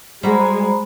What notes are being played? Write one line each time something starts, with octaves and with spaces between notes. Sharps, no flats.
G3 G#3 F#4 C5 A#5 B5